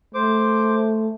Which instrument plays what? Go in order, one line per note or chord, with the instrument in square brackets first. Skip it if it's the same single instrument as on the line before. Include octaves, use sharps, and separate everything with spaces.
[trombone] A3 [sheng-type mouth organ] C5 D6